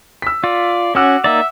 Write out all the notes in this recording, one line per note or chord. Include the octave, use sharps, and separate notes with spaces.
E6 B6
F4 D5
C#4 F#4 F#5 D6 E6
A#3 D#4 D5 E5